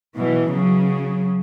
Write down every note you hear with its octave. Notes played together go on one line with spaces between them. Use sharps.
B2 E3
C#3 F#3